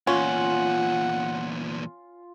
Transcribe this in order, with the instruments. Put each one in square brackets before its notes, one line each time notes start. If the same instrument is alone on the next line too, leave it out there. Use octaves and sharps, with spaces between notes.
[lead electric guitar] E2 A#2 [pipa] C#4 [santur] F4 [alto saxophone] F#5